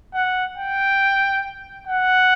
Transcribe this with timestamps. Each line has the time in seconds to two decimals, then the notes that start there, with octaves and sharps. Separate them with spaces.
0.15 F#5
0.58 G5
1.88 F#5